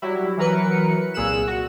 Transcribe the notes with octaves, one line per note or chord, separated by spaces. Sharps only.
F#3 G3 E4
E3 F#3 A#4 B4 C#7
C2 A#2 G#4 E6 F#6 E7
F#4